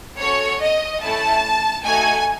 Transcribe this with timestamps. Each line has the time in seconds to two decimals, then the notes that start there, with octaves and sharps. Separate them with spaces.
0.19 C#4 F#4 A4 C#5
0.61 D#5
1.02 A3 C#4 E4 A4 A5
1.84 A3 D#4 F#4 A4 G#5